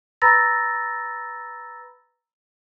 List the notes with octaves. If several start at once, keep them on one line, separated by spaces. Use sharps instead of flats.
B4 A#5 B5 E6 A6 A#6